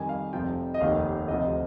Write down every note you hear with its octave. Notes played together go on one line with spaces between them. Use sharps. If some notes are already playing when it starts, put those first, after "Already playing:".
Already playing: F2 D#3 G3 G#5
F5
F1 F2 C3 F3 G5
D#5
F1 D#2 D#3 F5
D2 C3 F3 D#5
C5